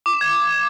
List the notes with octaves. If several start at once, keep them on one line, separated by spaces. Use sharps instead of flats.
D6
E7
G#6